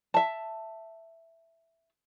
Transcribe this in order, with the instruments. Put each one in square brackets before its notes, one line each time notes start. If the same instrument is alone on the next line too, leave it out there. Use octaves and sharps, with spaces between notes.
[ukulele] E5 A5